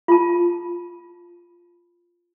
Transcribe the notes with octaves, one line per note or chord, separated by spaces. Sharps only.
F4 A5